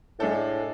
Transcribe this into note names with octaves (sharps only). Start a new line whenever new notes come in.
A2 G#3 D4 A4